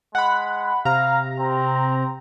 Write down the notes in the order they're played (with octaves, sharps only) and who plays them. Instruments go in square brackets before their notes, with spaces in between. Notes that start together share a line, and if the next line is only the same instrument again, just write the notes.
[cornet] G#3 [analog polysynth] F#5 B5
[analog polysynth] C3 A#5 [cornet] F5
[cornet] C4